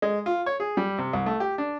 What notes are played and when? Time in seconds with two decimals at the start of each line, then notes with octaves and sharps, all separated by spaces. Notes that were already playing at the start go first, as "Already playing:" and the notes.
0.02 G#3
0.26 F4
0.46 C#5
0.60 G#4
0.77 G3
0.98 C3
1.13 C2
1.26 A3
1.40 G4
1.58 D4